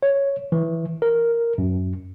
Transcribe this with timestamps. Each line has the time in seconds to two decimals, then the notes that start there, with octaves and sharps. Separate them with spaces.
0.03 C#5
0.52 E3
1.02 A#4
1.58 F#2